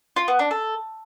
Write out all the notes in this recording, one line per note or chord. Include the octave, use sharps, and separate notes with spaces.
F4
B3
D4
A4